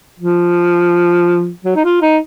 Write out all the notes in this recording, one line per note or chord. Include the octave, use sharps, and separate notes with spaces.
F3
F#3
D#4
F4
D#4